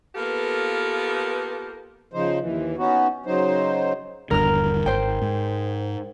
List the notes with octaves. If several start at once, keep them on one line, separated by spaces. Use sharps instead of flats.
A#3 B3 F4 G4 A4 B4
C#3 F3 D#4 C5
D#2 E3
B3 C#4 D#4 F#4
C#3 F#3 D#4 C5
D#1 G2 D3 A#4 F6
G#1 C5 G5
G#2